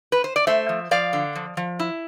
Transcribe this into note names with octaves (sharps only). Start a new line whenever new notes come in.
B4
C5
D5
A3 C5 E5
F3
F3 D5 F5
D3
F3
F3
E4